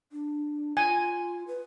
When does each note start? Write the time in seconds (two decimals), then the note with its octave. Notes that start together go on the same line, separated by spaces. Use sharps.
0.12 D4
0.77 F4 G#5
1.47 B4